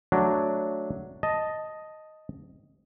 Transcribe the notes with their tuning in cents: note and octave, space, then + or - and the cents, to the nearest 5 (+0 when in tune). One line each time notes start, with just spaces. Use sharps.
F#3 +0 A3 +0 D4 +0
D#5 +0 A5 +5